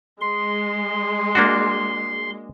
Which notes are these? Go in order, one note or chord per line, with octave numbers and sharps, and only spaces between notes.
G#3 C6
A#3 D4 F#4